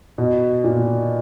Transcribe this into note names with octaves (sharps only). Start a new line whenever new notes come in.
B2
A#2